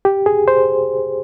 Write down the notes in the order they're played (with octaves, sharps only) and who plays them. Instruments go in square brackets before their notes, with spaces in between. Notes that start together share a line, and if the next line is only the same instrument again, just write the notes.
[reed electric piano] G4
G#4
C5